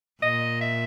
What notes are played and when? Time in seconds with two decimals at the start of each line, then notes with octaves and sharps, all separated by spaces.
0.22 A#2 D#5
0.61 E5